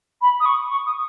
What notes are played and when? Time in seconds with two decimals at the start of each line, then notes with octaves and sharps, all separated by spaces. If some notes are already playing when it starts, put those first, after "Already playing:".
0.22 B5
0.40 D#6
0.46 C#6
0.71 C#6
0.86 D#6